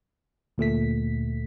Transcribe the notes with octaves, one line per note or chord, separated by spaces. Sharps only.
D2 A#2 A3 B6